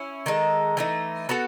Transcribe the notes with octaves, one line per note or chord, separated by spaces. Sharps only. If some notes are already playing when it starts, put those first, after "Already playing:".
Already playing: C#4 E4
D#3 G#3 D#4 A4
E3 A3 D#4
B3 F#4 A4